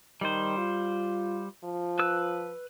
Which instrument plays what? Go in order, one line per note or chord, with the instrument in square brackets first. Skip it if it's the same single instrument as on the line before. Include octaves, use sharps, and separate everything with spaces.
[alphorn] D#3 [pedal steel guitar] G3 C5
[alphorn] F4
F3
[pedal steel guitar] B4 E6 F#6